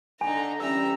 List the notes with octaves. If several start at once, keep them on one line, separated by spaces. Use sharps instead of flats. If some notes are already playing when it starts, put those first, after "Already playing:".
D3 D4 D#4 G#5 A#5
F2 E3 G3 C#4 E5 A#5 E6